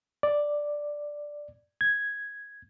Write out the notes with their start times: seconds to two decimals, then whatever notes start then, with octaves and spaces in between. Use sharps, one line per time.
0.23 D5
1.81 G#6